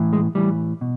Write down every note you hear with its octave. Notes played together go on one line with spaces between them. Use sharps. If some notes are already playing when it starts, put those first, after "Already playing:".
Already playing: A2 E3
G#3
A2 E3 G3
B2